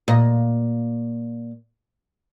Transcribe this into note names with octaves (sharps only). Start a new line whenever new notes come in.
A#2 D#5